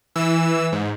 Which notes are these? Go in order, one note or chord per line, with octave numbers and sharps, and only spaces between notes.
E3 E6
G#2